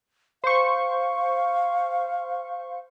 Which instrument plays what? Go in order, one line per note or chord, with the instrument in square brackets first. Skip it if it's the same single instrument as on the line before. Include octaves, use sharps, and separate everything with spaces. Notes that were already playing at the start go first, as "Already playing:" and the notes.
[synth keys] C5 C#6 [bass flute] F5